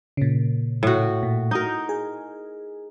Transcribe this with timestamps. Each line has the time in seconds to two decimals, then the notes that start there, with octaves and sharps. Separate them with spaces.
0.17 A#2 C#3
0.83 A2 F#4
1.23 A#2
1.51 D#4 F#4 A#4 D#6 G6
1.89 G#4